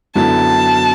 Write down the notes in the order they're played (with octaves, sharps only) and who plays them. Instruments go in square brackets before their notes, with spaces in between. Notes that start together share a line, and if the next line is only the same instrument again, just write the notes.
[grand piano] F#2 D3 F#3 B3 E4 [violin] A5